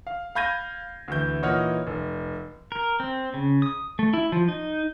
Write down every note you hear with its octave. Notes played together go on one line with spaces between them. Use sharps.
F5
F5 B5 G6 G#6 A#6 D#7
D2 E3 G6
A#2 E3 D#4 C#5 F#5 F6
F1
A#4
C4
C#3
D#6
A3
E4
F3
D#4